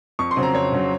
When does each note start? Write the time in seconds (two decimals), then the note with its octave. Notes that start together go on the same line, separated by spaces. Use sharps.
0.19 F2 C#6
0.31 C6
0.36 C#3 F#3 C4
0.43 A#5
0.55 F2 C#5
0.72 C#3 F#3 C4